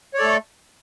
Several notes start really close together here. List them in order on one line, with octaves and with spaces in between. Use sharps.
C#5 D5 A4 A3